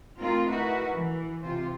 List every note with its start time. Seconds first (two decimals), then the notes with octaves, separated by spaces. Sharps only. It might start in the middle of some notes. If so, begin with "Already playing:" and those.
0.18 A3 A#3 C4 D#4 F4 A#4
0.49 D#4 E4 F#4 A#4 B4
0.93 E3
1.43 C3 F4 C5